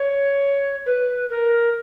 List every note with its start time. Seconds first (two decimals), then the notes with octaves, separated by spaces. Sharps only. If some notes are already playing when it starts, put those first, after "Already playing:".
Already playing: C#5
0.86 B4
1.30 A#4